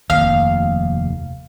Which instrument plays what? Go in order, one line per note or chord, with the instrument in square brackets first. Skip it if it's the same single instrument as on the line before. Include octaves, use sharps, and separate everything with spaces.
[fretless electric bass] F1 D#2 [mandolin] F5